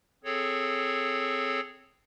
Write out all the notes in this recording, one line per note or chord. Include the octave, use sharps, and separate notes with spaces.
C4 G#4 A4 C#5